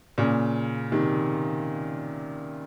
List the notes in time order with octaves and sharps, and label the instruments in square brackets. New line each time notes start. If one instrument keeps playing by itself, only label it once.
[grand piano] A#2 C#3
C3 D#3